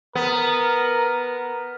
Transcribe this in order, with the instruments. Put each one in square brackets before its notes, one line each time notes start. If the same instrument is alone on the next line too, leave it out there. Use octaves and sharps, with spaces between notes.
[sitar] B3 [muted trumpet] A#4